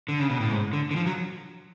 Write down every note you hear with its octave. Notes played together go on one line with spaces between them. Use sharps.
D3
C#3
B2
A2
G#2
D3
D3
F3
F#3